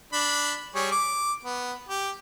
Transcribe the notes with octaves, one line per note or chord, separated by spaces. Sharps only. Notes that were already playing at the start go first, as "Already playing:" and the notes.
D4 B5
G3 G#4 C#5
D6
B3
G4